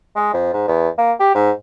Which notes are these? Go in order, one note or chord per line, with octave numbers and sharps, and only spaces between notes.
G#3
F2
G#2
E2
A#3
G4
G#2